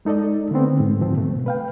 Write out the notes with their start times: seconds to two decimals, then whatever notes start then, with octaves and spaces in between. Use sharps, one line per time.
0.05 G#3 D#4 A4 D5 D#5
0.51 D3 A3 B3 C4
0.80 G#2
0.98 D2 G2 D3 F3 C4
1.16 B2 A3
1.46 B4 F5 G5